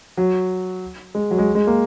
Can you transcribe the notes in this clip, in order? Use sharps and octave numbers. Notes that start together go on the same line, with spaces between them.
F#3
G#3
F#3
G#3
G#3
A#3